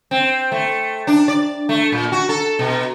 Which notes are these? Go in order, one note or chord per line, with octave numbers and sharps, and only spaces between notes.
C4
A3
D4
D5
A3
A#2
F#4
A4
B2